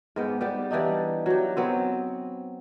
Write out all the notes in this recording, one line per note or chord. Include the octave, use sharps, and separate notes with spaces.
G#2 B3 G5
G3 B3 G4
E3 G3 D4 D#4
F#3 G4
F#3 B3 C4